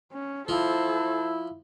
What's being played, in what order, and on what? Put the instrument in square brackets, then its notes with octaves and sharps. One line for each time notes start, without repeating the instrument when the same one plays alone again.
[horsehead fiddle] C#4
[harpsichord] F3 [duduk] E4 [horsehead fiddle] A4 C5